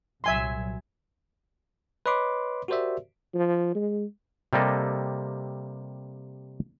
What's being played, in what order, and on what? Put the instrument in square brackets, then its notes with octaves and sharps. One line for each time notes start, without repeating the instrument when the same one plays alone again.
[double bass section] C2 A#2 F#3 [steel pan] E5 G#5 C6
[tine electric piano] B4 C#5 D#5 B5 C6 D6
F#4 G4 A#4 C5 D5 E5
[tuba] F3
G#3
[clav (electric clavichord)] C3 G3 A#3 A4 D#5